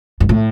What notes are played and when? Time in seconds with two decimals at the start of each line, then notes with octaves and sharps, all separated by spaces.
0.20 G2
0.29 A2